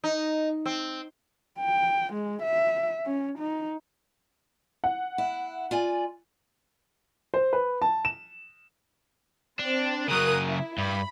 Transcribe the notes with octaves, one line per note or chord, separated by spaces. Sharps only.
D#4
C4
G5
G#3
E5
C#4
D#4
F#5
E4
F4 D5 G#5
C5
B4
A5
E7
C4 D4
C#3 F#3 A#4 D#6 F#6
E4
G2 B5